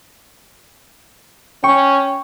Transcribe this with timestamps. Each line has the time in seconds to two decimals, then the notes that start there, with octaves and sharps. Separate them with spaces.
1.64 C#4 G5 C#6